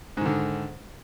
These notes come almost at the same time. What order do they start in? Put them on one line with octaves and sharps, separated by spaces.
G#2 D#3 D3